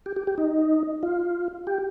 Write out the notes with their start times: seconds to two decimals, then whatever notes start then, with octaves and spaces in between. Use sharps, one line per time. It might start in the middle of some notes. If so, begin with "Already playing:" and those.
0.06 G4
0.16 G4
0.27 G4
0.38 D#4
1.03 F4
1.67 G4